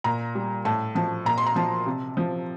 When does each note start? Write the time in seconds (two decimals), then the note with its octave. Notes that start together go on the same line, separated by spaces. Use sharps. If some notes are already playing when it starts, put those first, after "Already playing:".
0.04 A#2 A#5
0.35 G3
0.65 A2 A5
0.95 F3 A5
1.25 A#2 A#5
1.38 C6
1.46 A#5
1.56 F3 A5
1.86 C3
2.17 F3